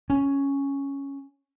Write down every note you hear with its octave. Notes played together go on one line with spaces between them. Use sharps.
C#4